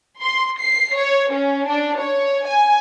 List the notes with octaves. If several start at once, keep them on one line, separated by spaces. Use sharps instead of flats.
C6
C7
C#5
C#4
D4
C#5
G#5